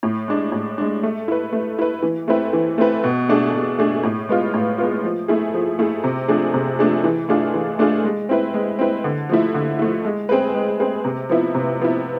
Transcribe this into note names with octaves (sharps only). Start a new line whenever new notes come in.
A2
G#3 D4
A2
G#3 D4
A3
E4 B4
A3
E4 B4
E3
A3 C4 E4 B4
E3
A3 C4 E4 B4
B2
A3 D4 G#4
B2
A3 D4 G#4
A2
G#3 B3 F4
A2
G#3 B3 F4
F3
A3 E4 G#4
F3
A3 E4 G#4
C3
F3 A3 D4 G#4
C3
F3 A3 D4 G#4
E3
A3 D4 F4 G#4
E3
A3 D4 F4 G#4
G#3
C4 E4 B4
G#3
C4 E4 B4
D3
F3 A3 E4
D3
F3 A3 E4
G#3
C4 G#4 B4
G#3
C4 G#4 B4
C3
F3 B3 E4
C3
F3 B3 E4